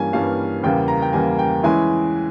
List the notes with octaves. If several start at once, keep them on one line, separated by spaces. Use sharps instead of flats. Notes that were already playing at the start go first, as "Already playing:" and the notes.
Already playing: G2 E3 G3 A#3 C#4 G#5
G2 E3 G3 A#3 C#4 F5
E2 C#3 G3 A#3 G5
A#5
G5
E2 C#3 G3 A#3 G#5
G5
E3 G#3 C#4 E4 G#5